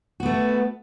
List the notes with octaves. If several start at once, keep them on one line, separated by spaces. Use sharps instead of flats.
A3 B3 F#4